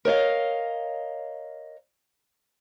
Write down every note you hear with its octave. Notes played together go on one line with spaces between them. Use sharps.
A#4 C#5 D#5 F5